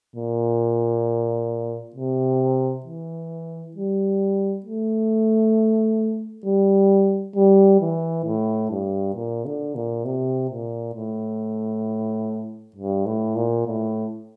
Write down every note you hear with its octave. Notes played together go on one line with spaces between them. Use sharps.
A#2
C3
E3
G3
A3
G3
G3
E3
A2
G2
A#2
D3
A#2
C3
A#2
A2
G2
A2
A#2
A2